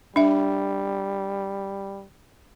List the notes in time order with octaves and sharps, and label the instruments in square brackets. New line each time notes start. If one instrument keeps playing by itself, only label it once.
[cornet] G3 [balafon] D4 E5